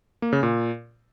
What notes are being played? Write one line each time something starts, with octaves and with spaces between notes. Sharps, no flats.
A#3
C#3
A#2